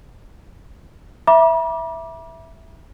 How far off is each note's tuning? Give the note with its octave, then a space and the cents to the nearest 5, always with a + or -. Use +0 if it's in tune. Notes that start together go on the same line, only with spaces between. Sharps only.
E5 +0 B5 -45 D6 +0